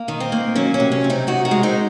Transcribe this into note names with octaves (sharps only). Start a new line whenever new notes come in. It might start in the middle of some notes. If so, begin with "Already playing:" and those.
Already playing: A#3
D#3
C4
A#3
F#3 C#4
C#4
C3
C#4
C3
C4 D#4
D#3 D#4 F#4
F#4 A#4
G#3
C4 D#4